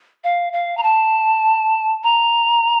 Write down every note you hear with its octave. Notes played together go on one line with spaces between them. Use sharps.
F5
F5
A#5
A5
A#5